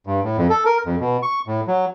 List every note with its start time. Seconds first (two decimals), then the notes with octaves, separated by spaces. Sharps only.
0.07 G2
0.24 A2
0.37 F2
0.50 A4
0.66 A#4
0.86 F2
1.00 B2
1.23 C#6
1.47 A2
1.67 F#3